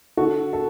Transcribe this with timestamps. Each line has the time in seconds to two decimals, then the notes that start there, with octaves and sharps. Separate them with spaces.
0.17 D3 F#4 A4
0.53 A4